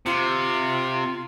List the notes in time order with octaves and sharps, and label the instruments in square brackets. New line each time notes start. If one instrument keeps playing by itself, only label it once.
[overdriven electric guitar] C3 [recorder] F4